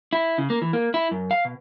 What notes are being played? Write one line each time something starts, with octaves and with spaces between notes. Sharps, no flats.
E4
C#3
A#3
E3
A#3
E4
F#2
F5
B2